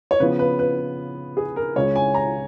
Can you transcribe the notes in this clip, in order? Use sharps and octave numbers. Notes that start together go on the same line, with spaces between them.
C#5
C#3 F3 B3 B4
B4
B4
G#4
A#4
C#2 C#3 G#3 C#5
G#5
A#5